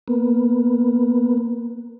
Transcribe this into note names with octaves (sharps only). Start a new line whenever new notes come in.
A#3 B3